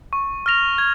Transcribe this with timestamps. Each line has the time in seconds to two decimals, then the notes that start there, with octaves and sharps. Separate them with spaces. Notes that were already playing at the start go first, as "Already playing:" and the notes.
0.13 C#6
0.46 F6 A#6 F7
0.78 G#6